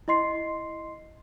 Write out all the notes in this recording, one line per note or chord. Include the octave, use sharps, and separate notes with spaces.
E4 D#5 C6 C7